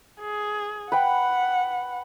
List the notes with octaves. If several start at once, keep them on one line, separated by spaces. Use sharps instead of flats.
G#4
B4 F#5 G5